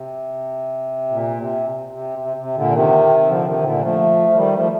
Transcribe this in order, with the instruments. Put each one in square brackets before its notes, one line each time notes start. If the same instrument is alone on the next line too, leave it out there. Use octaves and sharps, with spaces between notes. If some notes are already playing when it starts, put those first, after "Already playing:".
Already playing: [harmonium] C3
A#2
C3
C3
C3
C3
A#2 D3
C3 D#3
D3 F3
C3 D#3
A#2 D3
F3 A3
F3
D#3 G3
F3 A3